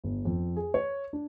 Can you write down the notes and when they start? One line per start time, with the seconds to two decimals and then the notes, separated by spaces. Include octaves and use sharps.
0.04 G1
0.25 F2
0.56 G#4
0.74 C#5
1.13 D4